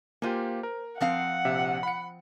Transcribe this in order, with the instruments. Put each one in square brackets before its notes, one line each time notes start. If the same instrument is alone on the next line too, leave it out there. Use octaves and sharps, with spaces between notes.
[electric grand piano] A#3 F4 G4 [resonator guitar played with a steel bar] C5 G#5
[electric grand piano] A#4
[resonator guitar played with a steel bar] F3 C4 F5 [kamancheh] F#5
[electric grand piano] A#1 C3 E5
B5 C#7